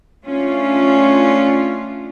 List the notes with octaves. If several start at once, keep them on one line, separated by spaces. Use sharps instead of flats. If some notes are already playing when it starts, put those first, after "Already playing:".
A3 C#4 D4 F4